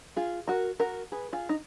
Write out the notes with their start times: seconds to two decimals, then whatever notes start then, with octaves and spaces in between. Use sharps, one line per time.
0.16 F4 G#4
0.47 F#4 A#4
0.80 F#4 A#4
1.12 G#4 B4
1.33 F4 G#4
1.49 D#4